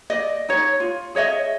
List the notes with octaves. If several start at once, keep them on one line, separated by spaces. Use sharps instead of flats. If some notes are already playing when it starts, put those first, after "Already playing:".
D5 D#5
D#4 C#5
F4
G#4 C#5 D#5 E5